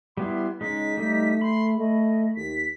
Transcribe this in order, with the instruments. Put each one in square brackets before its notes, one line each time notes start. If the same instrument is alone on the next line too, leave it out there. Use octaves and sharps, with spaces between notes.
[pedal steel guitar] G3 B3 E4 [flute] C6
[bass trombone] C#3 [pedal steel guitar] G#3 D#4 [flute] B6
[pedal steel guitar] G3 D#4 [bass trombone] A3
[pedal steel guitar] B5 [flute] C6
[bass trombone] A3 [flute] D#5
[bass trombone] D#2 [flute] B6